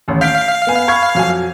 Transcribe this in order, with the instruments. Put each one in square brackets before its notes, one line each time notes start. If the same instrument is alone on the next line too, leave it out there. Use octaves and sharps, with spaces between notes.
[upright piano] A1 D#2
[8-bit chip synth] F5 [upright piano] G6 B6 D7
[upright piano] B3 G#5
B5 C#6 G#6
F2 F#3 G#5